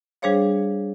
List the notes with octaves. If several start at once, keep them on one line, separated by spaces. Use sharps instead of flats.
G3 D4 G#4 C5 C#5 F5